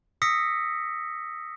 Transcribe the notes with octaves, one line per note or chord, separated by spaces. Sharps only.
D#6 E6 A#6 B6 C#7